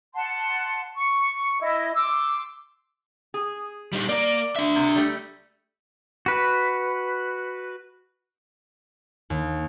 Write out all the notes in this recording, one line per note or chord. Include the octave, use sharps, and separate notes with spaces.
F#5 A5 C6
C#6
E4 D#5
C6 D6 E6
G#4
G3 D#4
A#3 A#4 D5
D4 E5
C3
G3 A3
F#4 B4
D#2